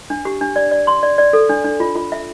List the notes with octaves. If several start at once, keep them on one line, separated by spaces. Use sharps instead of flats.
D4
G4
D4
D5
D5
C6
D5
D5
A4
D4
D4
F4
F4
E5